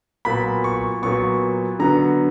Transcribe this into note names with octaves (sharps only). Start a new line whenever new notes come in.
A#2 F#3 B3 B5
C#6
A#2 F#3 B3 C#6
D3 F#3 B3 A#5